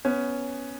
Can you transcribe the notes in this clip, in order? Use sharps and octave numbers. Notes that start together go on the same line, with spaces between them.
B3 C#4